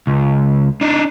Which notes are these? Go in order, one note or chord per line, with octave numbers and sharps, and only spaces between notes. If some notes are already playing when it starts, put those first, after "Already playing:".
C#2
D4 D#4